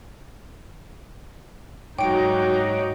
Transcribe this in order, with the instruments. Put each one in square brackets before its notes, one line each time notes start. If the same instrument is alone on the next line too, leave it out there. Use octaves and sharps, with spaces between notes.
[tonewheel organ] G#2 C#5 D6 [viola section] F#3 D#4 F#4 [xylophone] G5 D7